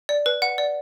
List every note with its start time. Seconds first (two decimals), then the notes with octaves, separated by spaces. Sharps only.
0.09 D5
0.26 B4
0.42 F#5
0.58 D5